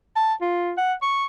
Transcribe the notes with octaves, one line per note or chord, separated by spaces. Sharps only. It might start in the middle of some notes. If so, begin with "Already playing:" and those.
A5
F4
F#5
C#6